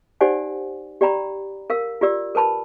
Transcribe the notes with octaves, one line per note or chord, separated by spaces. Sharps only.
D#4 G4 C5 D5 F#5 G#5
G4 D5 G5 A#5 B5
A#4 F5 E6
F4 G4 D5 E6
A#4 B4 A5 B5